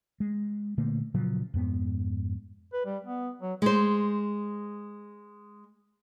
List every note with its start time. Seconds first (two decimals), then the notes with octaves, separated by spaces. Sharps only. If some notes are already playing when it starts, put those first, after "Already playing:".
0.20 G#3
0.78 A#2 D3 A3 A#3
1.14 A#2 C#3 F3 F#3
1.54 F2 G#2 B3
2.73 B4
2.85 G3
3.05 B3
3.42 F#3
3.62 G#3 C5